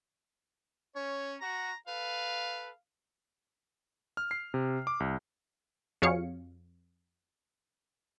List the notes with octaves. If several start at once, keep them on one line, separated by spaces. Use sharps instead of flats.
C#4 C#5
F#4 A#5
A4 B4 F5
F6
C7
C3
D6
C2
F2 F#4 G#4 C#5 F5 C#7